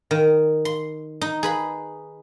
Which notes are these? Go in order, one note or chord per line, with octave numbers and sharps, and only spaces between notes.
D#3
C6
D#4
G#4 B4 B5